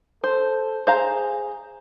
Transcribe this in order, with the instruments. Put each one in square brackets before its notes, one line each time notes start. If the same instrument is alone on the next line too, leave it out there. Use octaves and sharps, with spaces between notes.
[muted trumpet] A4 [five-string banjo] C5
[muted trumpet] G#4 [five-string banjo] C5 F5 A#5